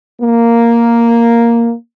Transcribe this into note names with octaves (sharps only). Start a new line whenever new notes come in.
A#3